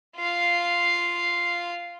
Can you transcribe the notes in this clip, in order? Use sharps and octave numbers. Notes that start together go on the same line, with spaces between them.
F4 F5